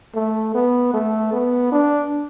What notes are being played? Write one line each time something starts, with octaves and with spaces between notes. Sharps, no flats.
A3
B3
A3
B3
D4